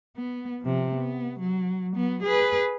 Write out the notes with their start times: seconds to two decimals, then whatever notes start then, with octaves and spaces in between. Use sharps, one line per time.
0.17 B3
0.62 C3 F3
0.95 B3
1.40 F#3
1.95 F#3 B3
2.23 G#4 B4